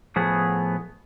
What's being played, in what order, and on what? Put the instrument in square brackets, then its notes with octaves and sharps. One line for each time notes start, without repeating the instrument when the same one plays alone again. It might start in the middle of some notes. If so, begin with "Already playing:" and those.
[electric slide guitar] A2 F3 B3 G#4